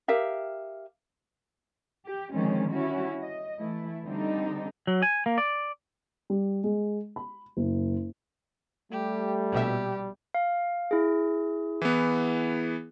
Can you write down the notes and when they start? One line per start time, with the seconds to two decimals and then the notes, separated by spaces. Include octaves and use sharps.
0.08 G4 A#4 E5 F5
2.04 G4
2.32 D3 D#3 F3 G#3 C4 C#4
2.71 G3 C#4 E4 F#4
3.22 D#5
3.58 E3 A3 E4
4.04 D3 G3 C4 D4 D#4
4.87 F#3
5.02 G#5
5.26 A#3
5.38 D5
6.30 G3
6.64 G#3
7.16 B5
7.57 F#1
8.92 G3 A3 G4
9.53 A#1 B2 G4 E5
10.34 F5
10.91 E4 G#4
11.82 E3 B3